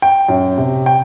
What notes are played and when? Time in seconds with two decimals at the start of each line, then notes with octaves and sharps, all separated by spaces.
0.02 G5
0.28 F#2
0.57 C3
0.86 G5